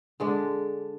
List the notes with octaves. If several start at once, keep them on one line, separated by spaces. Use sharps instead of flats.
D3 G#3 D4